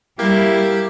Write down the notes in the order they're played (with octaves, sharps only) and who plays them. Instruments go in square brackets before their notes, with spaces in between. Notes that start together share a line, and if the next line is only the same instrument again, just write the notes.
[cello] G3 [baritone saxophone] A#3 [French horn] E4 [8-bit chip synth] G4